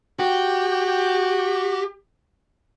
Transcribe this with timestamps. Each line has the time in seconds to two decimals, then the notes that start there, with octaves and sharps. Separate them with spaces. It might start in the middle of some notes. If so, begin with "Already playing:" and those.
0.19 F#4 G4